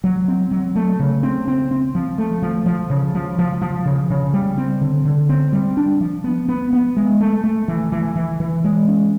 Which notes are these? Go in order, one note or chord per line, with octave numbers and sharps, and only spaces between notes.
F#3
C4
F#3
A3
C#3
C4
C4
C4
F3
A3
F3
F3
C#3
F3
F3
F3
C#3
C#3
G3
C4
D3
D3
C4
G3
D4
F3
B3
B3
B3
G#3
A3
A3
E3
E3
E3
E3
G#3
C#4